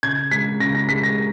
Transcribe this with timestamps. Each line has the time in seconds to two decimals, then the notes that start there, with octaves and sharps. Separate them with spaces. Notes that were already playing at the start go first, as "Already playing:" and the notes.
0.03 C#3 G#6
0.31 G#3 B6
0.60 C#3 A#6
0.75 A#6
0.89 G#3 B6
1.03 A#6